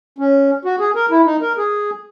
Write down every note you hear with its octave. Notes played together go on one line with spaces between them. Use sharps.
C#4
F#4
G#4
A#4
E4
D#4
A#4
G#4